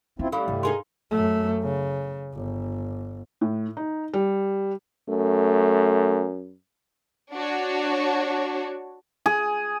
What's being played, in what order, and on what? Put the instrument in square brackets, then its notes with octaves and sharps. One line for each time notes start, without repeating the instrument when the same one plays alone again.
[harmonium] C4 E4 F4 [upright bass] C#4
[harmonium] A2 G3 [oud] E3 [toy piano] A4 F5 B5
[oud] E2 [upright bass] G2 C3
[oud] D#4 G#4 A#4 [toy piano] C6
[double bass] F#2 A3
C#3
G1
[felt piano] A2
D#4
G3
[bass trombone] F#2 [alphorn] A3
[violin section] D4 F#4 C#5
[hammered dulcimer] G#4